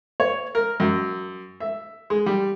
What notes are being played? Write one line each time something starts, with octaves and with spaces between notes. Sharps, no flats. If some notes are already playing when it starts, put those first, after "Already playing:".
C#5
A#4
F#2
E5
G#3
G3